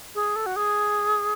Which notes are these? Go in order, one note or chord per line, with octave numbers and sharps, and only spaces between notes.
G#4
A4
F#4
G#4